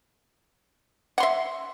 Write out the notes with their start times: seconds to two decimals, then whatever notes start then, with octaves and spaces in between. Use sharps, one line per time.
1.18 F#5
1.20 C6
1.23 E5